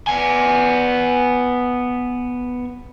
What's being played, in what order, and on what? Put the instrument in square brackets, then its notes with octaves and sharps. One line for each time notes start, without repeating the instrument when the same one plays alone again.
[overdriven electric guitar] B3 G#5